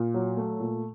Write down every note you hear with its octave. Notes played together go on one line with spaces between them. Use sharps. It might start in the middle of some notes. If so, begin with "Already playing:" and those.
Already playing: A#2
F#3
A3
A#2